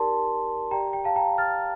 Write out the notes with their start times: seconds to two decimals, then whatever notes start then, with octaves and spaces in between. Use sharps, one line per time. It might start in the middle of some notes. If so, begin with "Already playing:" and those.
Already playing: D#4 G4 A#4 D5 A5 C6
0.71 G4 D5 G5 A#5
0.93 G5
1.04 F5 A5
1.16 G5 A#5
1.38 F6 A6